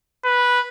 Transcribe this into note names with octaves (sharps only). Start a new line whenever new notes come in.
B4